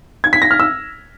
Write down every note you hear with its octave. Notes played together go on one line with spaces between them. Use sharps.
G#6
B6
A#6
F6
E6